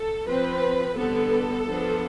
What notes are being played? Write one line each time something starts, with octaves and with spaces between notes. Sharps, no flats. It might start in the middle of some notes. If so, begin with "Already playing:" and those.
Already playing: A4
F3 C4 B4
D3 G3 B3 A4
F3 B3 D4